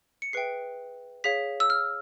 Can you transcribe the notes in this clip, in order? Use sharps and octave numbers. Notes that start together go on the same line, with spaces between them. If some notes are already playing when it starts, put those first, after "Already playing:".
C#7
G#4 B4 E5 G5 C7
G#4 C#5 F5 B6
E6
F6